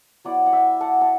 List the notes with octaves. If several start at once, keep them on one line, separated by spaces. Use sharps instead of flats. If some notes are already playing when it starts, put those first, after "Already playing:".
F#3 B3 E4 D5 F#5
F#5
E5 G5
F#5 A5
A5